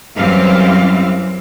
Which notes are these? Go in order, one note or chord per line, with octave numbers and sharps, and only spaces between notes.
F#2 E3 G3 C4 F5